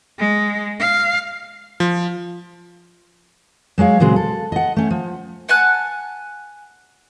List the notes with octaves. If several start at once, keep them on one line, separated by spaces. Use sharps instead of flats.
G#3
F5
F3
F#3 G#3 C#5 F5
A#2 C#3 F#3 G#3 C4
A4
D#5 F#5
A3 C#4
F3
F#5 G#5 A5 F#6